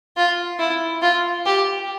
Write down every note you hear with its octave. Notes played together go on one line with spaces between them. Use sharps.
F4
E4
F4
G4